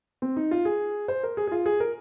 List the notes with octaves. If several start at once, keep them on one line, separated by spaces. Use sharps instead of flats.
C4
D#4
F4
G#4
C5
A#4
G#4
G#4
F4
G#4
A#4